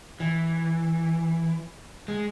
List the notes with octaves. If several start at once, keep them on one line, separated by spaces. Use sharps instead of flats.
E3
G#3